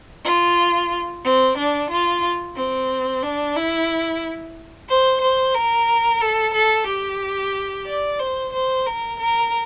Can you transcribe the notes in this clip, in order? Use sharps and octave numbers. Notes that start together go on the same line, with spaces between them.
F4
C4
D4
F4
C4
D4
E4
C5
C5
A#4
A4
A4
G4
D5
C5
C5
A#4
A#4